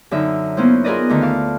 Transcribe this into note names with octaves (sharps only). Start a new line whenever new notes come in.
F#2 D3 D#4 E5
A#3 B3 C#4 E4 C5
F4 G#4 A#4 B4 D5 D#5
D2 D3 D#3
F5 A5 D6